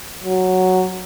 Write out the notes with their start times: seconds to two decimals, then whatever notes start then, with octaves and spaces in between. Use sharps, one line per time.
0.24 F#3